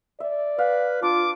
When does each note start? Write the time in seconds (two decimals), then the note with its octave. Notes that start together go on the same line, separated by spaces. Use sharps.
0.20 D5 E5
0.58 B4 F5
1.02 D4 F4 D6